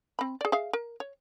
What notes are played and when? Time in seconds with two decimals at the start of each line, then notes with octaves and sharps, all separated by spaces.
0.19 C4 B5
0.41 G#4 D5
0.52 G#4 E5 F5
0.73 A#4
1.00 C#5